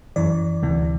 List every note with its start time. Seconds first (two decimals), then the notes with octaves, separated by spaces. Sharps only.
0.16 F#2 E3 D5
0.63 D2 C3 E3